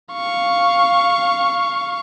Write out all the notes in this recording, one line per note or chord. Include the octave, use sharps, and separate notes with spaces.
F5 C#6